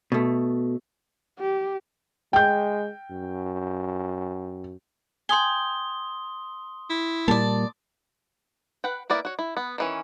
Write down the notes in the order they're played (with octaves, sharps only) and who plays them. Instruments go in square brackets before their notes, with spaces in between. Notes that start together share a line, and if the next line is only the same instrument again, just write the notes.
[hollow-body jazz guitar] B2 A3
[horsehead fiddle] G4
[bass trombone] G#3 [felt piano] G5 G6
[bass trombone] F#2
[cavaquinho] G5 G#5 [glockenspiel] C6 D#6 G7
[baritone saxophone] E4
[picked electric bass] A#2 G3 A#3 [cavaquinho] D5 A5
[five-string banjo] B4 F#5 G5
A#3 B3 E4 A#4 D5
F#4 C#5
E4
B3
D#3 E3 C#4